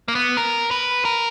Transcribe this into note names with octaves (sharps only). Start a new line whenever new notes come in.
A#3
B3
A#4
B4
A#4